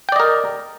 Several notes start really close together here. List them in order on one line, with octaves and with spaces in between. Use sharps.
G5 D5 D#5 A#4